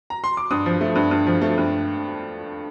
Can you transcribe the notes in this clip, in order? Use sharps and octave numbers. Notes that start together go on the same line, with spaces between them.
A#5
C6
D6
G2 D#6
F3
A3
G2
G2
F3
A3
G2